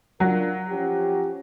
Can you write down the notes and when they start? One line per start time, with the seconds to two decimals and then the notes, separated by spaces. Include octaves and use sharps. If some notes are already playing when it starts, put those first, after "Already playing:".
0.20 F#3 D4 F4 A#4
0.69 F3 C#4 G4